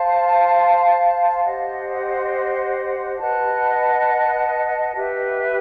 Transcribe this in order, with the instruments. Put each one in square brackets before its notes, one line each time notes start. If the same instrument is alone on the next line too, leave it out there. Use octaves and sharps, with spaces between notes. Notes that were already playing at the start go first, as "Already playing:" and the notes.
Already playing: [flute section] C5 F5 A5
G4 C5 D#5 F#5
B4 D#5 F#5 A5
G4 B4 E5